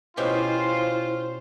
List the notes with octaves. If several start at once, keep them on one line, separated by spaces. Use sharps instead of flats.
B2 C#4 E4 F4 G4 C5